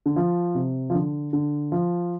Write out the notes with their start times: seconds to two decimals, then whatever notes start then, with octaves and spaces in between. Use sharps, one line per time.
0.06 D3
0.16 F3
0.55 C3
0.90 F3
0.94 D3
1.33 D3
1.72 F3